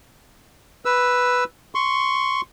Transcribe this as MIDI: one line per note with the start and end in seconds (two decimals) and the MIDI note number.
0.85 1.44 71
0.85 1.44 88
1.75 2.41 84
1.75 2.41 85